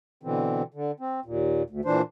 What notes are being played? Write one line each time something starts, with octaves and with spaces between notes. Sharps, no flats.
B2 D3 E3 C4
D3
C4
D#2 A#2
D2
A#2 E3 D4 C5